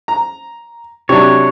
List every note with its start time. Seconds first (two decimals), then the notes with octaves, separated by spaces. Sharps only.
0.08 A#5
1.09 C3 F#3 D4 C#5